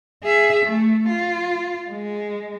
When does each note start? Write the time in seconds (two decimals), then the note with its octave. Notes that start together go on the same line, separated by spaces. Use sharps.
0.23 G#4 E5
0.66 A3
1.09 F4
1.91 G#3